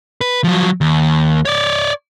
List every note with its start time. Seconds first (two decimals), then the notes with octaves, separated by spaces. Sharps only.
0.21 B4
0.44 F3 F#3
0.81 D#2
1.45 C#5 D5